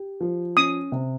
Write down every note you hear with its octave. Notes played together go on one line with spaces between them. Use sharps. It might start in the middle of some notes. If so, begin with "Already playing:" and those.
Already playing: G4
F3
C#4 D#6
C3